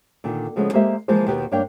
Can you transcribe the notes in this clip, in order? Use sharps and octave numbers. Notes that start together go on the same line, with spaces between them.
A#2 D3 D#3
C#3 F3 G#3 A3 B3 C#4
G#3 A#3 G4 C5 D#5 E5
E3 F3 G#3 A#3 F4 C5
D#2 B2 G4 A#4 B4
G2 A#3 D4 C#5 F5 G5